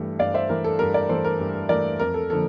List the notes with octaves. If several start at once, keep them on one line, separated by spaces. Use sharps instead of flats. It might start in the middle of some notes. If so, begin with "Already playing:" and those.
Already playing: G2 E3 A3
G2 D5 F5
C5 E5
E3 A3 A#4
A4
G2 A#4
A#4 D5
E3 A3 A4 C5
A#4
G2
E3 A3 A#4 D5
F2 A#4
A4
D3 F3 A#3 A4